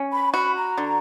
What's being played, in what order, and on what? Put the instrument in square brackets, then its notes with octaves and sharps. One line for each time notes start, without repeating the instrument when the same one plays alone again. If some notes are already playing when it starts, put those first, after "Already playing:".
Already playing: [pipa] C#4
[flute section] B5
[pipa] F#4 [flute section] B5
[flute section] A#5
[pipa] D3